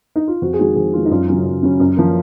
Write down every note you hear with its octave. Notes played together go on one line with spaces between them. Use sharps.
D#4
F4
F2 F#4
G#4
D#3 G#3 F#4
F2 G#4
D#3 G#3 F4
D#4
F#2 F4
C#3 F#3 C#4
F#2
C#3 F#3 C#4
F#2
F3 A#3